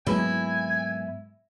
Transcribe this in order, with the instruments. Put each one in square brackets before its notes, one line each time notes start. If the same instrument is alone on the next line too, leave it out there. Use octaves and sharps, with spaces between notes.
[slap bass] G#2 A#3 [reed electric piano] F#3 G#3 B3 [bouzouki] E4 [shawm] G#5